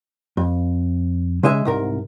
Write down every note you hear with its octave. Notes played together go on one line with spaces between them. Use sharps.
F2
C#3 G#3 D#5 E5 G#5
C2 G#2 A#4